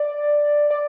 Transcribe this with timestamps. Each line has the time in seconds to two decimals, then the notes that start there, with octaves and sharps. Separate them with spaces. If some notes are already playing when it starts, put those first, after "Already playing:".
Already playing: D5
0.70 D5